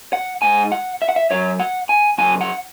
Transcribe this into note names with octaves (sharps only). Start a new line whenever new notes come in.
F#5
G#2 G#3 G#5
F#5
E5
F#5
E5
F#2 F#3 C#5
F#5
G#5
F#2 C#3 F#3 G#5
F#5